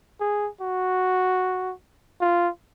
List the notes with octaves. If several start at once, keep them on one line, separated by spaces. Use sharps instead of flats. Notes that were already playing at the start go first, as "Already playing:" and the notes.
G#4
F#4
F4